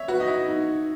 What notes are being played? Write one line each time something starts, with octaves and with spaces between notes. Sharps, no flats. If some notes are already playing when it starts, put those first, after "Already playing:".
Already playing: C#5 E5
F#4 B4
D#4
E4
D#4